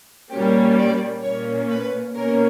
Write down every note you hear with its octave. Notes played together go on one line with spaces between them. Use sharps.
A#2 G3 A#3 C#4 G4
D5
A#2 A#3 C#4 C#5
B4
B2 A#3 C#4 A#4